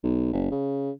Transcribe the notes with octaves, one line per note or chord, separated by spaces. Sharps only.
B1
F#1
C#3